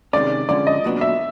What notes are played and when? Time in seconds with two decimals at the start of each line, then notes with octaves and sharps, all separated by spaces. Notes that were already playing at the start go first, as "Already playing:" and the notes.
0.13 C3 D#3 G#3 C#4 D5
0.49 G2 D3 F3 G#3 C#4 D5
0.67 D#5
0.84 B1 A#2 F#3 B3 D4
1.01 E5